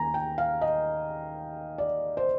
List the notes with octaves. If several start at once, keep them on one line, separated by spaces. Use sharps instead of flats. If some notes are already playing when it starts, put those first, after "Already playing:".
Already playing: D#2 D#3 A#3 G#5 A#5
G5
F5
D#5
D5
C5